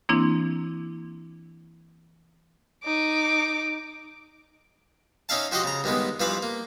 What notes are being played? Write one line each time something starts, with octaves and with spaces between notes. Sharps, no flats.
E3 A#3 C4 D4 E4
D#4 D6
C#4 D#4 E5 F5 A5
F3 F#4 G4 D#5 C6 D#6
C#3 A#5
G2 D#3 G#3 B3
G2 E3 F3 F5 B5
A#3